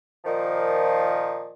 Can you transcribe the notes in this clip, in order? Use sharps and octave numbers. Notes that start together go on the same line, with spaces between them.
A#2 D#3 F3